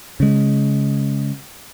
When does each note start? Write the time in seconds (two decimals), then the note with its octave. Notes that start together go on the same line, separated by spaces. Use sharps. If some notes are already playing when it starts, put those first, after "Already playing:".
0.20 C#3 G#3